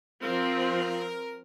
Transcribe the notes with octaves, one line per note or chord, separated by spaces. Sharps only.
F3 C4 F4 A#4